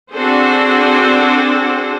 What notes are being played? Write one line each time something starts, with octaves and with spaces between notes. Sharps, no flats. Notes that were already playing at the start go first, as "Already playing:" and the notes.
C4 D4 F#4 G#4 A4 C5